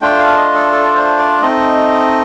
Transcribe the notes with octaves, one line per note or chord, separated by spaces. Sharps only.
A3 D4 F4 G5
F5
D#5
A4
A4
D5
C5
D5
A3 C4 D#4 D#5